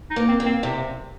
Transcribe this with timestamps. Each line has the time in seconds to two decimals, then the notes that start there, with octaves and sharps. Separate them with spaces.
0.10 D#4
0.16 A#3
0.28 C4
0.40 A#3
0.46 C4
0.63 C3